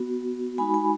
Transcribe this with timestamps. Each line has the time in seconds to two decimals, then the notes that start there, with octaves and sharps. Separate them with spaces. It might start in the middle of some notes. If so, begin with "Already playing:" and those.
Already playing: B3 F#4
0.58 G#3 D#4 F#4 G#5 B5
0.74 G#5 B5